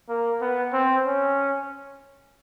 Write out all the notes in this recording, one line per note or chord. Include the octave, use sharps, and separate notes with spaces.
A#3
B3
C4
C#4